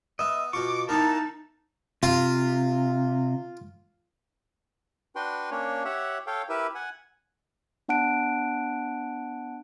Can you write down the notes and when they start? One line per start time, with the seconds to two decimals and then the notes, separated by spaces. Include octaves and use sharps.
0.19 B3 D#5 E5
0.53 B2 F4 C#6 D6
0.89 E3 B3 D#4 A#4 A5
2.03 C3 F4
5.16 D4 F#4 B4 G5 C6
5.51 A#3 C#4 D4 C#5
5.85 G4 C#5 E5 F#5
6.27 A4 C#5 F5 G5
6.49 E4 G4 A#4 B4 E5
6.75 F#5 G#5
7.88 B3 D4 F#5 A5 F#6 D7